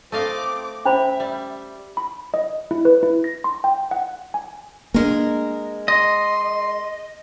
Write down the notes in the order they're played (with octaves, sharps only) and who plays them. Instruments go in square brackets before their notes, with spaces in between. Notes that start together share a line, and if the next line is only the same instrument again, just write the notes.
[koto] A3 D#5 F5 [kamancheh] C4 D6
[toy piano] C#4 C5 B5 [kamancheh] E5 [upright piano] G5
[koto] G3
[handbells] B5
D#5
E4
B4
E4
A#6
C6
G5
F#5
G#5
[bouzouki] G#3 A#4 [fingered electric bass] A#3 D4
[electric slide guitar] D#5 [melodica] C6